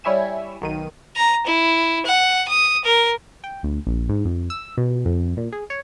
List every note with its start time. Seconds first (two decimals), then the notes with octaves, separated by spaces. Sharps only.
0.04 G3 E4 C#5 E5 G#5 E7
0.61 B1 D#3 D#7
1.16 A#5
1.46 E4
2.05 F#5
2.48 D#6
2.84 A#4
3.44 G5
3.63 D2
3.87 A#1
4.09 G#2
4.25 F2
4.50 E6
4.78 B2
5.05 F2
5.37 A#2
5.52 G#4
5.70 C#5